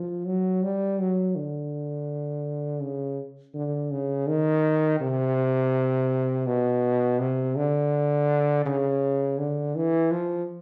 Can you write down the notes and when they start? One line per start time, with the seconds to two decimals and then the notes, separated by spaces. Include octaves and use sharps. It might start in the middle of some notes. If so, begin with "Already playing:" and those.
Already playing: F3
0.26 F#3
0.63 G3
0.99 F#3
1.36 D3
2.82 C#3
3.54 D3
3.91 C#3
4.28 D#3
5.01 C3
6.47 B2
7.19 C3
7.56 D3
8.66 C#3
9.38 D3
9.75 E3
10.11 F3